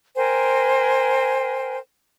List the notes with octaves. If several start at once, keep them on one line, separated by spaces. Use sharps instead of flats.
A#4 C5 G5 G#5